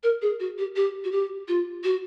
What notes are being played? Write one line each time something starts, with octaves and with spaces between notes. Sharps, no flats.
A#4
G#4
F#4
G4
G4
F#4
G4
F4
F#4